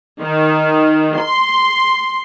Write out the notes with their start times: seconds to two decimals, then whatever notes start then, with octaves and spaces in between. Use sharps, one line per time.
0.22 D#3
1.19 C6